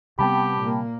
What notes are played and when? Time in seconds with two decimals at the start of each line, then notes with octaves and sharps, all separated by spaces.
0.19 C3 G3 B3 C4 G4 G5 A5 B5
0.60 A#2 A#3